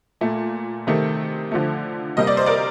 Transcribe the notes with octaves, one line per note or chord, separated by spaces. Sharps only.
A#2 A3
C3 D#3 A3
D3 F3 A3
C3 G3 A#3 D#5
D5
C5
A#4 D5